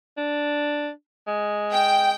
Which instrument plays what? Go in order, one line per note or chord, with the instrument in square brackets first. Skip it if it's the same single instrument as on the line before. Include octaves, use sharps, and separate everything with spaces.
[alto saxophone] D4
G#3
[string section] G5